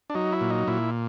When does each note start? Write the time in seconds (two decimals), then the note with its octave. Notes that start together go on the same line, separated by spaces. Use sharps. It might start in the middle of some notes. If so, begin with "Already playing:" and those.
0.10 D4
0.15 F#3 D#4
0.32 E4
0.41 A#2
0.50 D#4
0.68 A#2 E4